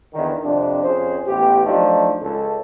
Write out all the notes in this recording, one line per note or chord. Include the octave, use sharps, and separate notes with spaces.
E2 D3 D#3
F2 C3 D4
F2 C#4 G#4 C5
A1 B3 G4
F3 F#3 A3 D4 D#4
C#2 A4